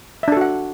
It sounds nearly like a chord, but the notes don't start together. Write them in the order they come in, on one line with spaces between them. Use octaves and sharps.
E5 D4 A4 F#4 F#5